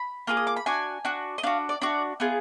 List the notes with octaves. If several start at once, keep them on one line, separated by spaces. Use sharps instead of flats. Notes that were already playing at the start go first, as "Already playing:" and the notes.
Already playing: B5
A#3 F4 G#4 D6
D#6
D6
B5
D4 F#4 G#5
D4 F#4
D#5
D4 F#4 F5
D5
D4 F#4 D5
B3 F4 G#4